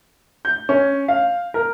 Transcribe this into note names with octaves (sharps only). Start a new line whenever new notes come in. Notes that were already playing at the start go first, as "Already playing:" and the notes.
G6
C#4
F5
A#4